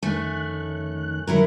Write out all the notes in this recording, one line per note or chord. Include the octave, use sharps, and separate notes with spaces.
F2 D#3 A3 C#4 F#6
F#2 D3 D#3 F#3 E4 A#4